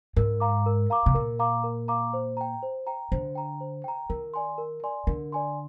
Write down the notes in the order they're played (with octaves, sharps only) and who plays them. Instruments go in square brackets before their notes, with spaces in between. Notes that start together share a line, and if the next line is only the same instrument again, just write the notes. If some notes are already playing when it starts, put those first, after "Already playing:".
[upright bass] G#2 [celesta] A#4
[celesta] F5 A#5 D6
A#4
F5 A#5 D6
[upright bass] C3
[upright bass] A#2 [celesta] A#4
[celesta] F5 A#5 D6
A#4
F5 A#5 D6
C5
G5 A#5
C5
G5 A#5
[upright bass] D3 [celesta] C5
[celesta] G5 A#5
C5
G5 A#5
[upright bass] D#3 [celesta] A#4
[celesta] D5 G#5 C6
A#4
D5 G#5 C6
[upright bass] D3 [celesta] A#4
[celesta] D5 G#5 C6